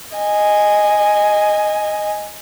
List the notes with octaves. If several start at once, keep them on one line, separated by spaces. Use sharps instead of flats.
D#5 G#5